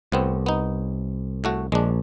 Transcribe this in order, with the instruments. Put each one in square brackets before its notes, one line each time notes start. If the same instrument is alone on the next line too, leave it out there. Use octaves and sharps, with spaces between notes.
[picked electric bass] C2 [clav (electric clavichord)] A2 B3 C4
[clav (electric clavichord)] B3 D#4
A2 A3 F#4
[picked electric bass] A#1 [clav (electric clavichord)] G#3 D4